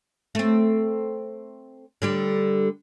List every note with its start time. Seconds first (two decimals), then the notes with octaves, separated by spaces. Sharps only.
0.35 A3 C4
2.02 D3 G3 G4